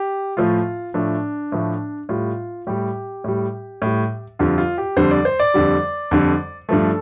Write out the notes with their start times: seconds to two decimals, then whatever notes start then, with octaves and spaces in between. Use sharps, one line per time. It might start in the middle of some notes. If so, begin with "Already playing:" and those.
Already playing: G4
0.37 A2 F3 A3 F4
0.94 A2 F3 A3 D4
1.52 A2 F3 A3
2.09 A2 G3 F4
2.67 A2 G3 G4
3.24 A2 G3
3.82 A2 G3
4.39 F2 D3 G3 F4
4.58 F4
4.78 G4
4.96 F2 D3 G3 C5
5.11 D5
5.25 C5
5.40 D5
5.54 F2 D3 G3
6.11 F2 D3 G3
6.69 G2 F3 A3 A4